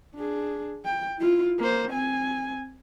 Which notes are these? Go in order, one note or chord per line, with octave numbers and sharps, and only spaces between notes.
D4 G#4
G5
E4 F4
A#3 C5
C4 G#5